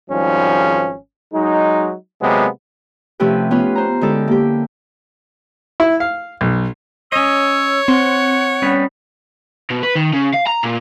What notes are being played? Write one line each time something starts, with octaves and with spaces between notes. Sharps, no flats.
G#1 G#2 F3 G3 C#4
F#3 G#3 D#4
C3 F#3 G#3 A#3 B3
C3 F3 A3 C#4 G4 B4
B3 C#4 F4 B4
C5 A#5
D3 G#3 C#4 E4 G4 A4
A#3 G4
E4
F5
B1
C#4 C#5 D#5 E6
C4 F#5 C6
G3 B3 C#4
B2
B4
D#3
C#3
F5
A#5
A#2